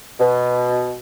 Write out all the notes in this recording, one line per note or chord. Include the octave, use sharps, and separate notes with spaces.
B2